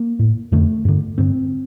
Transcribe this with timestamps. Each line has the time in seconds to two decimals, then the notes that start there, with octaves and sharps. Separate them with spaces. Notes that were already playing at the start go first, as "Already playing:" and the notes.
Already playing: A#3
0.19 A2
0.52 F2 D3 A3
0.85 G2 D3
1.18 G2 D3 C4